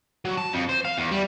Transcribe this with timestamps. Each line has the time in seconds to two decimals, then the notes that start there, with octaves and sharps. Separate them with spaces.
0.25 F#3
0.38 A5
0.54 F2
0.69 C5
0.85 F5
0.98 E2
1.11 G3